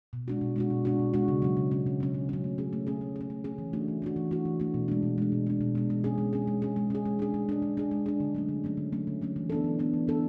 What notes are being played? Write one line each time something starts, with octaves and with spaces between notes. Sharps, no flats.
B2
G#3 D4 F#4
B2
G#3 D4 F#4
B2
G#3 D4 F#4
B2
G#3 D4 F#4
C#3
F#3 C#4
C#3
F#3 C#4
C#3
F#3 C#4
C#3
F#3 C#4
A3
C#4 G#4
A3
C#4 G#4
A3
C#4 G#4
A3
C#4 G#4
E3
A3 D4 F#4
E3
A3 D4 F#4
E3
A3 D4 F#4
E3
A3 D4 F#4
B2
G#3 D4
B2
G#3 D4
B2
G#3 D4
B2
G#3 D4
G#3
C#4 G#4
G#3
C#4 G#4
G#3
C#4 G#4
G#3
C#4 G#4
G#3
D4 G#4
G#3
D4 G#4
G#3
D4 G#4
G#3
D4 G#4
D3
F#3 A3 C#4
D3
F#3 A3 C#4
D3
F#3 A3 C#4
D3
F#3 A3 C#4
E3
B3 D4 A4
E3
B3 D4 A4
E3
B3 D4 A4